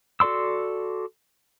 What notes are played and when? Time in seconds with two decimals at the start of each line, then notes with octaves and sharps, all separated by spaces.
0.20 F#4 A4 D5 C6 E6